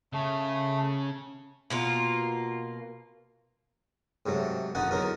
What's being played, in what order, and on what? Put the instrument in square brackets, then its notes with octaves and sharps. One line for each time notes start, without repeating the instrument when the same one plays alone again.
[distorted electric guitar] C#3 [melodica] A3
[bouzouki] B2 A#3 F4
[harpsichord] G#2 C3 F#3 A3
A#1 F2 D3 D#4 F#5 C#6
E2 D3 F#3 D#4 A#4